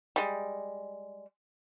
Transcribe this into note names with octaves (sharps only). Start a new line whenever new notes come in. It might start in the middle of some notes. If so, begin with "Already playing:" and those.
G3 G#3